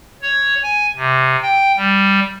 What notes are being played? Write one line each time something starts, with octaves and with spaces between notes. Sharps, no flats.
C#5
G#5
C3
G5
G3